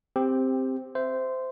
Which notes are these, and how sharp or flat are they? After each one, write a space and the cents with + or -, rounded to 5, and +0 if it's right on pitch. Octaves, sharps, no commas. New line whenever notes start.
C4 +0 G4 +10
C5 -15 E5 +0